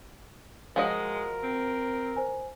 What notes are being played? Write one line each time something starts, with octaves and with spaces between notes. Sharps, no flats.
F3 G#3 F#4 A#4 D#5
C4
C5 G#5